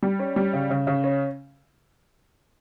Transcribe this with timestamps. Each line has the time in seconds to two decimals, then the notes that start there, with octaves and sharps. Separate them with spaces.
0.03 G3
0.19 C#4
0.36 G3
0.53 C#3
0.70 C#3
0.87 C#3
1.04 C#4